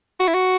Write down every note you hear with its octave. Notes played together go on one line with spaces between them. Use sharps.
F#4
E4
F#4